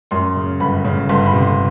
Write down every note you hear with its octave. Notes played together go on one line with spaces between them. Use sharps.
F#2 C6
C#3
G1 B5
C#3
G1 C6
B5
C3
C6